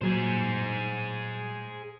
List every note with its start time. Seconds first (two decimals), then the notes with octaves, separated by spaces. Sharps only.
0.02 A#2 F#3 G#4 C5 G#6